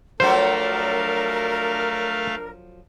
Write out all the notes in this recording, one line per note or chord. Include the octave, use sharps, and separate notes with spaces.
F3 F#3 A3 D4 A4 A#4 C5 F5